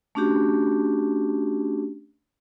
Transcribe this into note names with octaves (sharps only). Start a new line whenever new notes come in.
A3 C#4 D4 F#4 G4